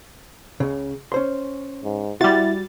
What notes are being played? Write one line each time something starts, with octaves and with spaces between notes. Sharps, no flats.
C#2 C#3
C#4 C5 C6
G#2
G3 E4 F#4 F#5 C6 A6